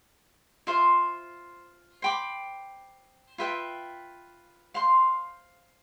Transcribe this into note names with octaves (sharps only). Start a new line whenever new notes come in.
F4 C5 E5
C5 G5 B5 D6
F4 B4 E5 G5
C5 F5 C6